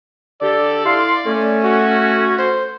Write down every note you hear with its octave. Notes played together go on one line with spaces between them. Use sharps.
D3 G4 A4 D5
E4 F5 C6
A3 C#4
F#4
C5